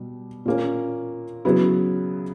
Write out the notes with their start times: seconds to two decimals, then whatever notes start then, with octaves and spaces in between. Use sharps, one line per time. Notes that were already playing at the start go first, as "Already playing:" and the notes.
Already playing: B2 G3
0.46 A#2 A#3 C#4
1.45 C#3 F#3 B3 E4